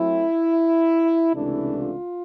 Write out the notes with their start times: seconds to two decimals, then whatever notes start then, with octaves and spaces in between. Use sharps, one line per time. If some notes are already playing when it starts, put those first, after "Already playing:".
Already playing: F#3 A3 C4 E4
1.34 C#2 C3 E3 A3 D4 E4
1.76 F4